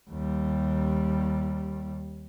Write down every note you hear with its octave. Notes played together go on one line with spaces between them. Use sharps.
D#2 G3